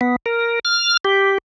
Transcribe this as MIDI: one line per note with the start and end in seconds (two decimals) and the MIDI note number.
0.01 0.16 59
0.26 0.59 70
0.65 0.97 89
1.05 1.38 67